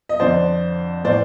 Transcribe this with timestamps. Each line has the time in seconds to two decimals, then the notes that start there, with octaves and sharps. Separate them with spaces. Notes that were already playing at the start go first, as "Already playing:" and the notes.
0.09 D#5
0.20 F2 D3 C5 D5
1.04 A2 E3 C5 D5